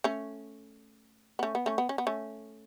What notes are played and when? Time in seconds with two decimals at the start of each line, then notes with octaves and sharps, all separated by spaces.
0.04 A3 C#4
1.39 B3
1.43 A3 C#4
1.55 B3
1.66 A3 C#4
1.78 B3
1.89 C#4
1.98 B3
2.07 A3 C#4